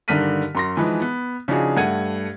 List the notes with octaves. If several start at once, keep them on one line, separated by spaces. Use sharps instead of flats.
G2 D3 D#3 F6 B6 D#7
F#2 C6 A#6
E3 F3 G#3 D#4 B4
B3
C#3 F3 D4 D#4 F#4 G#4
G2 A3 F#5 G#6 D#7